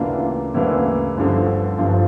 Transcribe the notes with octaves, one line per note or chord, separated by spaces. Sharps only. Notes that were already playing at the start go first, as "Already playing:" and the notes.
Already playing: D2 C#3 E3 A#3 D4 F4
D2 C#3 E3 A#3 D4 E4
G1 G2 D3 F3
G1 G2 D3 F3 F4